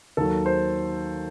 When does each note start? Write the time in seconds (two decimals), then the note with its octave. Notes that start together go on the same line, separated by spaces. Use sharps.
0.17 D#2 D#3 F#3 A4
0.46 C5